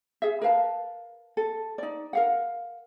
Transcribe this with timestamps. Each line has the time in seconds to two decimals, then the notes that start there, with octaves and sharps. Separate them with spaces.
0.22 G#4 E5
0.42 A#4 B4 F5 A5
1.37 A4
1.78 D#4 D5
2.13 A#4 F5 F#5